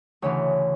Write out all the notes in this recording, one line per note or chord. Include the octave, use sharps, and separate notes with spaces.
D2 C#3 E3 C#5